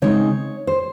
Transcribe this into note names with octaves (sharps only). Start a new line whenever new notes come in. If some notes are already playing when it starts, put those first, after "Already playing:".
C#3 G#3 C4 D#4 C#5
C5